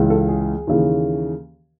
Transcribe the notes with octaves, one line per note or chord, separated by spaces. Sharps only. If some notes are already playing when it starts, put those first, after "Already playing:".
Already playing: C#2 C#3 E3
A4
G#4
D#2 C#3 E3